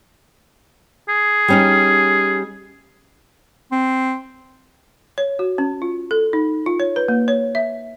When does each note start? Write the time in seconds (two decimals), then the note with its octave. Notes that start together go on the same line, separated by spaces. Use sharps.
1.09 G#4
1.48 G3 C#4 D#4
3.72 C4
5.18 C#5
5.39 F#4
5.58 C#4
5.82 F4
6.11 A4
6.33 D#4
6.66 F4
6.80 C#5
6.96 B4
7.08 A#3
7.28 C#5
7.55 E5